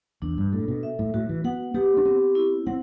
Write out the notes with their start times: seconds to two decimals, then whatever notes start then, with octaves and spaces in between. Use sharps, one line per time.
0.22 E2 D4
0.38 G2
0.52 A2 A4
0.68 B2
0.83 E5
0.99 A2
1.14 A2 F#4
1.29 E3
1.44 B3 F#5
1.74 B3 G4
1.97 D4
2.05 B3 C4
2.35 E4
2.66 C4 F#5